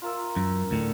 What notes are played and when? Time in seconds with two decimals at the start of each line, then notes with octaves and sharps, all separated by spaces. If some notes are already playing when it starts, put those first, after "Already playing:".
0.02 F4 A#4 E5
0.36 F#2
0.71 D2 A2 D3